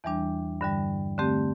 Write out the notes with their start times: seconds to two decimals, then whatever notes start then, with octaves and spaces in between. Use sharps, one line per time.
0.04 E2 E3 G3 D4
0.61 G2 D3 G3
1.18 D3 A3 C4 G4